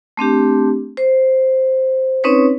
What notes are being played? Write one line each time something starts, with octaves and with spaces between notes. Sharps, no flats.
A3 C4 D4 G4
C5
C4 C#4 D#4 B4 C#5